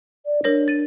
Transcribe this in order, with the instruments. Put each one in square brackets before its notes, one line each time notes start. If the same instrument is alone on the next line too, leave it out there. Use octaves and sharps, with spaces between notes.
[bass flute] D5
[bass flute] D4 [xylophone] A#4 C#5 A#6
[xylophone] A6 D#7